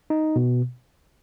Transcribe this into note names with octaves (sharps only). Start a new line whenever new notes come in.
D#4
B2